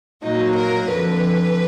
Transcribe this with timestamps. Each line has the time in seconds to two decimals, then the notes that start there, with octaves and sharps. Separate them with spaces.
0.23 A#2 F#3 A#3 D#4
0.56 A#4
0.88 F2 D3 F3 B4